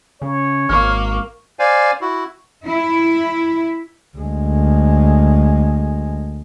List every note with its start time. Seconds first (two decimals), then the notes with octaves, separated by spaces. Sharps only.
0.22 C#3 C#5
0.69 G#1 A#3 C#6 F6
1.59 C5 D5 F5 G#5
2.01 E4 F#4
2.65 E4
4.17 D2 G#3